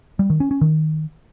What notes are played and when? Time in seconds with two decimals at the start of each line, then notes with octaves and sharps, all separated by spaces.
0.19 G3
0.30 D#3
0.40 C#4
0.51 C#4
0.61 D#3